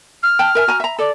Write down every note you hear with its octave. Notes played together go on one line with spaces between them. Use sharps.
F6
G5 A5
A#4 E5 G#5
F#4 G#5 A#5
E5 A#5
A4 D5